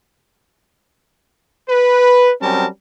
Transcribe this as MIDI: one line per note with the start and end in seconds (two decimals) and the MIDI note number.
1.69 2.32 71
2.41 2.67 54
2.41 2.67 55
2.41 2.67 60
2.41 2.67 61
2.41 2.67 70
2.41 2.67 81